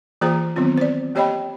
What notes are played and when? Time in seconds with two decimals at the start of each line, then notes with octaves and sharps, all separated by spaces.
0.21 E3 A#3 F4 G#4 C5 A#5
0.56 D#3 F#3 B3 C4 F4
0.78 C5 D5
1.15 A#3 G4 C#5 D#5 G5 B5